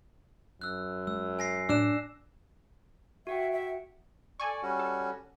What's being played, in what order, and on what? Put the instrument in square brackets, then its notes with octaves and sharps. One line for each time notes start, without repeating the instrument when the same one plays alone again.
[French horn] F#2 [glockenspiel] E6 F#6
[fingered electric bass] G#3 [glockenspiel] E6
[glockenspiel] G#5 A#6 C7
[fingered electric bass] A2 [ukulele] D4 [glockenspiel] E6 F#6 E7
[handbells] F#4 F#5 G5 [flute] E5
[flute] E5
[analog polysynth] A4 G#5 C#6 [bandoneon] D5
[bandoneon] G3 C#4 F#4
[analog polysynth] A4